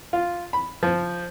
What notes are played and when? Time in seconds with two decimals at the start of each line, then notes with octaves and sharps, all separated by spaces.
0.13 F4
0.53 B5
0.83 F3